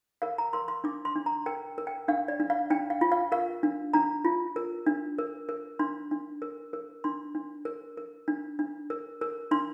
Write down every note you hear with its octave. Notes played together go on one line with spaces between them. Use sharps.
A#4 F5
A#5
A#4 C6
C6
D4 D6
C6
D4
A#5
A#4 G5
A#4
G5
D4 F5
D5
D4
F5
D4 G5
F5
F4
F5
A#4 F5
D4
D4 A#5
F4
A#4
D4
A#4
A#4
D4 C6
D4
A#4
A#4
D4 C6
D4
A#4
A#4
D4
D4
A#4
A#4
D4 C6